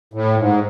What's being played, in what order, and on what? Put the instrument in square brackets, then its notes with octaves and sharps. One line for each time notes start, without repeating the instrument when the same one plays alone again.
[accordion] A2
G#2